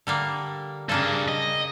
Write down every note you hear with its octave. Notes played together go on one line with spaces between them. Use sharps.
D3 G3 A#3
G2 C#3 A#3 A4
D#5